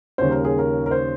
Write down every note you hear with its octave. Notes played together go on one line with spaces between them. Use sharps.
D#2 C#3 G3 C#4 C5
A#4
G#4
A#4
A#4
C5